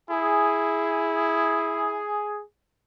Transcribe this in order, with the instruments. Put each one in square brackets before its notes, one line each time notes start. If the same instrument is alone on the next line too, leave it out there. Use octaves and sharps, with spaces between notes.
[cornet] E4 [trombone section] G#4